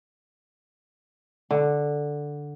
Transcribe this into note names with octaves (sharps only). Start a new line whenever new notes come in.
D3